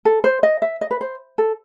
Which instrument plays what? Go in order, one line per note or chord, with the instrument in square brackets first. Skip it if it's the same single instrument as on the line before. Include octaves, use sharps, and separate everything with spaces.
[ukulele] A4
C5
D#5
E5
D#5
B4
C5
A4